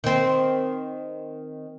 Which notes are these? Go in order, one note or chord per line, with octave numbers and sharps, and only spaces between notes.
D#3 C4